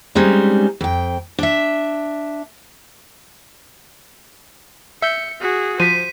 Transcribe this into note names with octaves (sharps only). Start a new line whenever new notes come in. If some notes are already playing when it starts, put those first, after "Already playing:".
G3 G#3 C4 C#4 D#4
F2 G5
D4 E5
E5 G6 C#7
F#4 G#4
F3 C5 B6 D#7